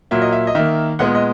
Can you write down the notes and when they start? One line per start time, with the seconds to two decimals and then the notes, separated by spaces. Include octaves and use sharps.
0.11 A#2 F#3 A#3 E5
0.22 D#5
0.32 E5
0.47 D#5
0.55 D#3 A#3 E5
0.99 A#2 G#3 B3 F#5
1.15 D#5